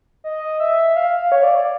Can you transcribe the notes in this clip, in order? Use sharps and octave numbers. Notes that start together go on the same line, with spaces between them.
D#5
E5
F5
F5
C#5
D5
D5